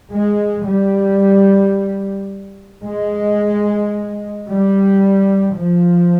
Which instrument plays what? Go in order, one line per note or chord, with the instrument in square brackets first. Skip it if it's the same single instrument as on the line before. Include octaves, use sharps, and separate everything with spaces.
[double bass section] G#3
G3
G#3
G3
F3